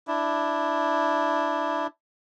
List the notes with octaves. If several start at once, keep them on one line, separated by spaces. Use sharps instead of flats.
D4 E4